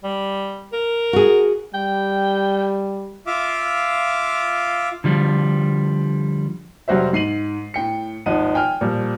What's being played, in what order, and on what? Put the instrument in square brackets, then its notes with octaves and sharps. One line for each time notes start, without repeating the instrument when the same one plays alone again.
[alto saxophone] G3
A#4
[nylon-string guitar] F#4 G#4
[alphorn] G3 [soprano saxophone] G5
[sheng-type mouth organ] F4 E5 F5 D6
[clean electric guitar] D3 F3 G3
[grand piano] F1 F#3 G3 F#4 C5 E5
G#2 C7 D#7 F#7
A2 G5 C#7
G#1 D#2 F3 D#4 F#5 D#7
G5 G#5 F6
A#2 F3 G3